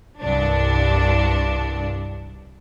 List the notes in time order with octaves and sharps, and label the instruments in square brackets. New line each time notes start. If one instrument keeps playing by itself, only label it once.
[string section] C2 G2 D4